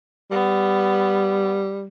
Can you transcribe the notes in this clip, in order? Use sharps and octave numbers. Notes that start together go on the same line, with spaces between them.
G3 B3